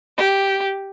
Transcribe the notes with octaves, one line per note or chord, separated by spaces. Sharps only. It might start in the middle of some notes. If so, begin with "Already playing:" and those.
G4